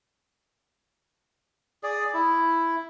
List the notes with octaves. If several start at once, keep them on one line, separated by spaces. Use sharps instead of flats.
G#4 D5
E4